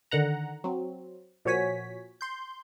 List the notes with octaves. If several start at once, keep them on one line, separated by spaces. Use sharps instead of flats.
D3 D#3 F#5 A#5
F#3 C4
A#2 F3 F#4 C#5 G#5 B6
C6 G6